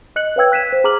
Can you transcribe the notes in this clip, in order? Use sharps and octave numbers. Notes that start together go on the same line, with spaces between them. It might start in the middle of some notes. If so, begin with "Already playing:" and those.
D#5 F#6 C#7 F#7
B4 C#5 F5 G5 E6 G#6
F#6 B6 D#7 E7
C5
G#4 A#5 D6 F6 F#7